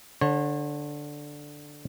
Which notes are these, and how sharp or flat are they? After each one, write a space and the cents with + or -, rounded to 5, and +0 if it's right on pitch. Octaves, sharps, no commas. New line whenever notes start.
D3 +0 C#5 -35